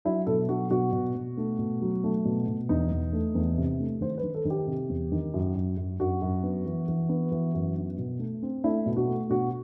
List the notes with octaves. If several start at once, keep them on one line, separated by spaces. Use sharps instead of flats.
F#3 E4
B2 A4
F#3 F#4
B2 F#4
B2
B2
A3
B2
F#3
A3
B2
B2
E2 D#4
E2
A3
E2
C3
A3
D#3 C5
B4
D#3
A4
D#3
G4
C3
E2
D#3
F#2
F#2
F#2
F#2 F#4
F#2
B3
E3
E3
B3
E3
F#2
B3
B2
A3
C4
A3 E4
B2
F#4
A3
B2 F#4